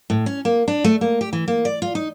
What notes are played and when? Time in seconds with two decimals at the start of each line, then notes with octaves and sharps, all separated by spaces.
0.10 A2
0.26 C#4
0.45 A#3
0.68 D4
0.84 A3
1.01 A#3
1.21 G4
1.33 E3
1.48 A#3
1.65 D5
1.82 F4
1.95 D#4